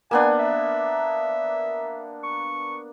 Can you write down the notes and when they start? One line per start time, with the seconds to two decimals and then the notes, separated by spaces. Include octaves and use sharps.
0.11 A#3 B3 D4 G#5
0.39 E5
2.23 C#6